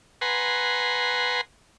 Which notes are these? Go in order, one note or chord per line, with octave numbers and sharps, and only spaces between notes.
B4 F#5 G#5 A#5 C6